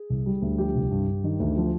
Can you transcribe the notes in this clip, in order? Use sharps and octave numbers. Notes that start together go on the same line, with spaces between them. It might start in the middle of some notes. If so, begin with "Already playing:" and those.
Already playing: G#4
C2
G3
D2
F3 G4
C2
G2
G2
D#3
D2
F3